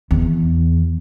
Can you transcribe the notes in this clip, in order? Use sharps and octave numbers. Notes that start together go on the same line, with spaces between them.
E2